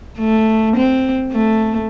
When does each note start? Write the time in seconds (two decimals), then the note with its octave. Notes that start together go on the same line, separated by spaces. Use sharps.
0.19 A3
0.76 C4
1.32 A3